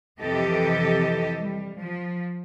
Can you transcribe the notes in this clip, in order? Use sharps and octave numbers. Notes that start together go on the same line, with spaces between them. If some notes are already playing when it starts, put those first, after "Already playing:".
F2 C3 E3 G4 A4 D#5
G3
F3